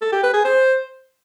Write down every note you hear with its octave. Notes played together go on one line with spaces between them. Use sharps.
A4
G4
B4
G#4
C5